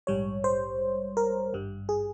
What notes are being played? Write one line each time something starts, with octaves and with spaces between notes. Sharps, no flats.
A#1 G#2 G3 C#5
C5
A#4
G#1 G2 G3
G#4